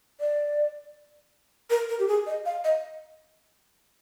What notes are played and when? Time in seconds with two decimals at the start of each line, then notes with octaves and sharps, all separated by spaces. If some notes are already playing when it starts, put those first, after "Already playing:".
0.20 D5
1.70 A#4
1.89 A#4
1.99 G4
2.08 G#4
2.26 D#5
2.46 F5
2.64 D#5